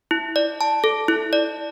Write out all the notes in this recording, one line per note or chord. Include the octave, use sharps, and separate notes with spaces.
E4
D5
A5
A4
E4
D5